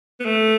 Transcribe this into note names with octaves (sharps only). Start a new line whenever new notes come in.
B3
A3